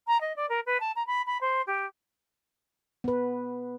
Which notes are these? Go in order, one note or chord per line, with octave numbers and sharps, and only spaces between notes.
A#5
D#5
D5
A#4
B4
A5
A#5
B5
B5
C5
G4
B3 B4